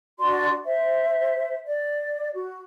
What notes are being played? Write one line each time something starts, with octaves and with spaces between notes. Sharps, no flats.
D4 F#4 D5 C6
C5 E5
D5
F#4